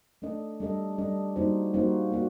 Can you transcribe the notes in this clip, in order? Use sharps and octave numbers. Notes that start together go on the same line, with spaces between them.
A3 D4 A4 D#5
G3 D4 A4 D#5
G3 D4 A4 D#5
G3 A#3 D#4 F#4 C5
G3 A#3 D#4 F#4 C5
A#3 F#4